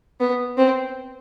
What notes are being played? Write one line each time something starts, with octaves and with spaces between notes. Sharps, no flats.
B3
C4